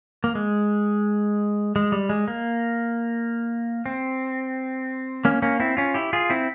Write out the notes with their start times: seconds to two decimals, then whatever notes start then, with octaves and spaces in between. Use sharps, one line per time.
0.24 A#3
0.35 G#3
1.76 G#3
1.92 G3
2.09 G#3
2.28 A#3
3.86 C4
5.25 A#3 C#4
5.42 A#3 C#4
5.60 C4 E4
5.77 C#4 F4
5.94 E4 G4
6.13 F4 G#4
6.30 C4 E4